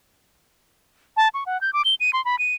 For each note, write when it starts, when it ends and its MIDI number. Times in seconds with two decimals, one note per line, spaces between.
1.17 1.28 81
1.34 1.44 85
1.46 1.60 78
1.61 1.73 91
1.73 1.82 86
1.85 1.95 103
2.00 2.11 99
2.13 2.23 84
2.25 2.38 83
2.39 2.55 99